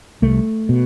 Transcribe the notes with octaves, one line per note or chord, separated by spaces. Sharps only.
C2 A3
B2